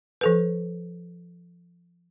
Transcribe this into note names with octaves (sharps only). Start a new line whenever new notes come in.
F3 A4 B4